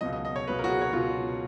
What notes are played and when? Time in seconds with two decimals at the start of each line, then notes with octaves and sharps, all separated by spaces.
0.01 C#2 B2 F#3 D#5
0.13 D#5
0.25 D#5
0.36 C#5
0.47 C#2 B2 F#3 B4
0.59 A#4
0.64 F#4
0.69 G#4
0.82 C#5
0.93 C#2 B2 F#3 F4